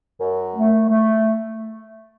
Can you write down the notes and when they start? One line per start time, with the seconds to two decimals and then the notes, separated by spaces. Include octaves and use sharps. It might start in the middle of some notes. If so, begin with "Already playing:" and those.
0.20 F#2
0.54 A3
0.89 A3